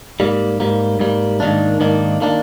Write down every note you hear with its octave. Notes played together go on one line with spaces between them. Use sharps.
G#2 G3 A#3
G#2 G3 A#3
G#2 G3 A#3
G#2 D#3 A#3 D4
G#2 D#3 A#3 D4
D#3 A#3 D4